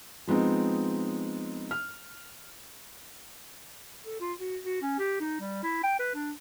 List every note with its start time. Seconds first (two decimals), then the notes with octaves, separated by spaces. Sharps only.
0.27 F3 G#3 B3 C4 D#4
1.71 F6
4.05 A4
4.20 F4
4.39 F#4
4.65 F#4
4.82 C#4
4.98 G4
5.21 D#4
5.40 G3
5.63 E4
5.83 G5
5.99 B4
6.15 D4